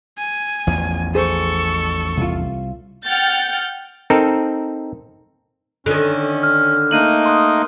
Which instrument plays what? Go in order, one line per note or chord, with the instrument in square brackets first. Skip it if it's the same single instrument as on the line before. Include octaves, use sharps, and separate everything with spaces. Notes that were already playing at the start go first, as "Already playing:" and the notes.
[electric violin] G#5
[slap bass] A1 E2 F3
[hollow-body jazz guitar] G#4 C5 [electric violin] A4 C#6
[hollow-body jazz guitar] C2 F4
[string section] F#5 G5 F6 G6 A6
[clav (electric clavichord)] C4 D#4 A4 A#4
[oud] D3 D#3 [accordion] C#4
[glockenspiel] F6
[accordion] A3 A#3 D#4 [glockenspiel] F#6 D#7 F#7
[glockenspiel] C6 D#6 F#6